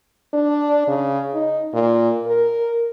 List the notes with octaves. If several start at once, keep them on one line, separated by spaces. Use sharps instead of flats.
D4
C#3
D#4
A#2
A#4